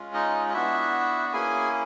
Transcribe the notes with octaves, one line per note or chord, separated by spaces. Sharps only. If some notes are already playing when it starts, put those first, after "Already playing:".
Already playing: G#3 C#4 F4
D#4 D#5
D#5
B3 D4 E4 F#4 E5
A#3 C#4 E4 G#4 G#5